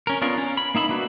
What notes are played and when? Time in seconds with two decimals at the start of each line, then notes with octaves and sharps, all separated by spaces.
0.07 C#4 A#4
0.22 B3 C#4 D4 F4 A#4
0.38 C#4
0.57 B5
0.75 A#3 D#4 E5 B5
0.89 A#3 D4 F#4 B4